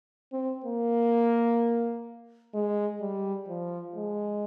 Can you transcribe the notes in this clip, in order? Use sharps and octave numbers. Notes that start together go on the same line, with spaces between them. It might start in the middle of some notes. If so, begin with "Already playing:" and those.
C4
A#3
G#3
G3
F3
G#3